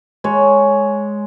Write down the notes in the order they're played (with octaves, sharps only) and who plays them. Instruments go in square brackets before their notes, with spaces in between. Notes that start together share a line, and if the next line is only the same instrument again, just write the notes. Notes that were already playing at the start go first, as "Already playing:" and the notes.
[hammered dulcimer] G#3 C#5